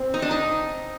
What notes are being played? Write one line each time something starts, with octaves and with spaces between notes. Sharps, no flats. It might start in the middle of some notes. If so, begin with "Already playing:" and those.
Already playing: C4
D#4
D4
D#4